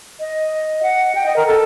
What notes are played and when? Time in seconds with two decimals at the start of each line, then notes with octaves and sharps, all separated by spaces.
0.20 D#5
0.83 F#5
1.15 G5
1.26 D#5
1.36 A#4
1.47 A4